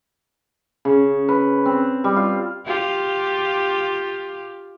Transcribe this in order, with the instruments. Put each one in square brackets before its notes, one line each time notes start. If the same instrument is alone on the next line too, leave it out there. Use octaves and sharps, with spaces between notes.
[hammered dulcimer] C#3
B4
C4
G3
F4
[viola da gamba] F4 G4